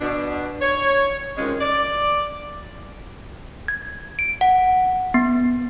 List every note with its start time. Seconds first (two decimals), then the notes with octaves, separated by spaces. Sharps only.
0.01 B2 D4
0.62 C#5
1.37 C3 D#3 G#3 C#4 F4
1.61 D5
3.68 G#6
4.19 D7
4.41 F#5
5.14 B3